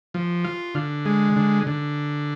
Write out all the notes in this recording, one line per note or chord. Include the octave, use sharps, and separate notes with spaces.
F3
F4
D3
G#3
D3
D3